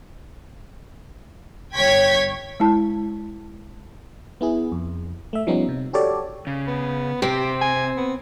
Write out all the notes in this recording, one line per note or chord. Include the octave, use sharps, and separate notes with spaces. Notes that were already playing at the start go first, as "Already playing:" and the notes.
G1 C#5 G5 C#6 G#6 B6
G#3 E4 A5
B3 E4 G#4
F2
A3 E5
F3 G3 B3 C#4 D#4
C3
F#4 G4 A4 C#5 D5
C#3
B3
C3 C4 G4
G#5
B3